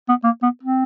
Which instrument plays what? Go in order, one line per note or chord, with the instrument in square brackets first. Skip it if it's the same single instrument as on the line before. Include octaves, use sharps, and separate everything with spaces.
[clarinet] B3
A#3
B3
C4